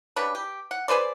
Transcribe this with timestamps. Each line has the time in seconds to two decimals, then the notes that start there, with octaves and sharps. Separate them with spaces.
0.16 C#3 D4 G4 B4
0.35 G4
0.71 F#5
0.88 G#4 B4 C5 D5